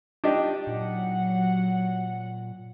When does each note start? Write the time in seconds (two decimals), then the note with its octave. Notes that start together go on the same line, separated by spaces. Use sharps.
0.24 D4 D#4 F4 G4
0.67 A#2 F#3 F#5